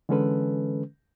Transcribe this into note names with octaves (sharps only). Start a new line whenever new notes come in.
D3 E3 G#3 C#4 A4 B4